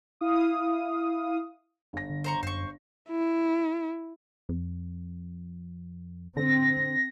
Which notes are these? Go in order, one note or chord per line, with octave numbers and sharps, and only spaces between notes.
E4 F5 D#6
G1 A#6
D3
C5 A#5 C#6
F#2 C5 C#6
E4
F2
D3 C4 A#6